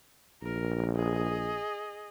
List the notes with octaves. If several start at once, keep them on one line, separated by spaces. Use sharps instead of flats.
A#1 A#4
G#4 D#5